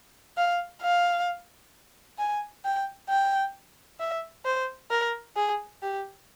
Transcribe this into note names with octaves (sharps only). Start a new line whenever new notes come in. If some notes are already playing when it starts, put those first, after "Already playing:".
F5
F5
G#5
G5
G5
E5
C5
A#4
G#4
G4